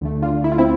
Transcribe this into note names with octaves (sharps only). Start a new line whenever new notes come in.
D2 D3 A3
D4 F4
E4
F4
C4 E4